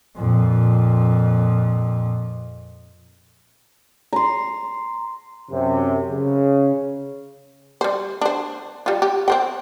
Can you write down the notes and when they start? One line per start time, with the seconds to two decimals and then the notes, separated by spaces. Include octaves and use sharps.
0.16 F2 A#2
4.13 A#5 C6
5.51 F#2 C3
6.10 C#3
7.81 G3 C5
8.21 D4 C5
8.86 G3 F4
9.02 G4
9.28 C4 C5 G5